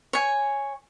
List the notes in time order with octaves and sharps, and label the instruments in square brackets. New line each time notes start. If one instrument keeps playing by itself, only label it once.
[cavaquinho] C#5 G#5